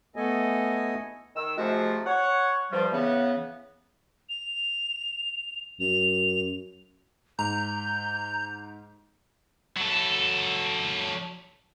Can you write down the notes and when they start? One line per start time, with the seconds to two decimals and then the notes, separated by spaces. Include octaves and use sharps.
0.16 A3 B3 A4 D#5 G#5
1.35 D#3 E6
1.57 C3 F3 G#3 A3 E4 F#4
2.06 C#5 F#5
2.71 G2 F3 G3
2.92 C#3 E3 B3
4.29 F7
5.80 F#2 F7
7.39 G#2 A#5 G6
9.77 F#3 A4